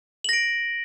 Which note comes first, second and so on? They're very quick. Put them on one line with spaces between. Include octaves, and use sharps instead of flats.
F#7 A#6 D7